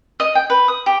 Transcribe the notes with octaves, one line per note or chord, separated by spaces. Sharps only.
D#5
G5
B4
D#6
G4